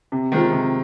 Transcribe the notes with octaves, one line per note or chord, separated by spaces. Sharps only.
C3
D#3 G#3 C4 F4
C3